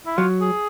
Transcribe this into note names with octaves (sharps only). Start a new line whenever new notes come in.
E4
F#3 F4
G#4